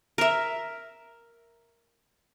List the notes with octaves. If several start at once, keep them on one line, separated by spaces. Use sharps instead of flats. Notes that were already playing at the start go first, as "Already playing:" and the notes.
A#4 E5